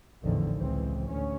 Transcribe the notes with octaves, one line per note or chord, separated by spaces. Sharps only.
A1 E2 D3 D#3 F3
C#2 E3 C4
D2 C#4